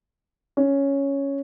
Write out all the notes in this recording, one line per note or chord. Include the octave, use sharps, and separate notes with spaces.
C#4